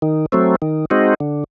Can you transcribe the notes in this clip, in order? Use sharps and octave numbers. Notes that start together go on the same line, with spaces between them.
D#3
F#3 A3 C4
D#3
G#3 C4 D#4 F#4
D3